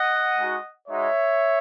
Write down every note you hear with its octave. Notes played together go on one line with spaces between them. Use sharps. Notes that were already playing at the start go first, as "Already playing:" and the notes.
Already playing: D#5 F#5
G#3 D#4 F#4
G#3 D#4 F#4 C#5 E5